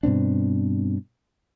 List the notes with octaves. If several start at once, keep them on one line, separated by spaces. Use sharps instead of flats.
G2 B2 C4 D4